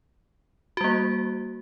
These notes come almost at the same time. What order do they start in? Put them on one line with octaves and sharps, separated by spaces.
F#4 G3 A#3